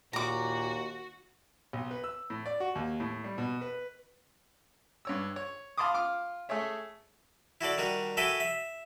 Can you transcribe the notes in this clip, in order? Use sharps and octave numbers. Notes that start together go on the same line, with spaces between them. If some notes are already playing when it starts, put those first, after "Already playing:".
D#2 A#2 F#4 A#5 D6
B1
B4
E6
A2
D5
F#4
D#2
A2
G3
B2
B4
G2 C#5 E6
C#5
F5 A5 B5 C6 D6 D#6
F4 D6 F6
A3 G#4 C#5 E5
E4 F#4 A4 D5
D#3 G3 D4 F#4
F#4 A4 E5 G5 G#5 B5
E5